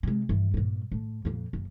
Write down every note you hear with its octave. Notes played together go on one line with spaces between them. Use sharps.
C3 G#3
G2 E3
G2 A#2
A2
F2 A#2
F#1